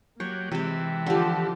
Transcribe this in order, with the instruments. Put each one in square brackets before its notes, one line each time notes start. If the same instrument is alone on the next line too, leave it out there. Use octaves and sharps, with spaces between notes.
[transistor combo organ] F#3 G4 [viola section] A#3 [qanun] C#5
[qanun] C3 G4 [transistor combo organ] E3 [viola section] G#3
[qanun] D3 F3 [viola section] F4 G4 A4